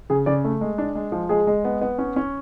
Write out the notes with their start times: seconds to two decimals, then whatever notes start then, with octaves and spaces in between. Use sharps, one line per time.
0.10 C#3 G#4
0.26 C#3 D5
0.44 A3
0.61 G#3
0.78 D4
0.95 G#3
1.12 F3
1.29 G#3 G#4
1.47 G#3
1.65 B3
1.81 B3
1.98 C#4
2.16 C#4